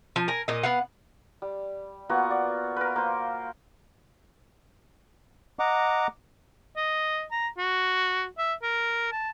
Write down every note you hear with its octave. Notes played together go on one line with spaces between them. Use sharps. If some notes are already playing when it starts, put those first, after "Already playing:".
F3
A#4 G#5
A#2 D#5
B3 F5 F#5
G3
A#3 B3 F4 F#4
D5
A#4 B4
A#3 C5
D#5 F#5 A#5 D6
D#5
A#5
F#4
E5
A#4
A5